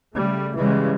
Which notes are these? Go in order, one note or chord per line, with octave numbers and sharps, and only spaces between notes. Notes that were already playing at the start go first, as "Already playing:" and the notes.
C#3 G3 A3
C#3 E3 G3 G#3